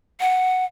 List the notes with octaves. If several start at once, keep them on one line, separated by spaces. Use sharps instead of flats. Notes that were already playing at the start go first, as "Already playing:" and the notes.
F#5